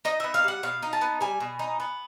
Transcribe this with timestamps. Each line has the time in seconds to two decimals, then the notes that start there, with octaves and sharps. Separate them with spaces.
0.05 D#4 D#5
0.20 B3 E5
0.34 F5
0.44 G3 F#5
0.63 B2 F5
0.83 D#4
0.93 A5
1.01 B3
1.21 G3 G#5
1.40 B2
1.59 D#4
1.80 B3